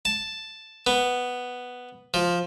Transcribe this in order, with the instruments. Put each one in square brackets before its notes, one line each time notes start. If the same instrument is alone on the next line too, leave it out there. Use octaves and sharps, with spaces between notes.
[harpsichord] A5
B3
F3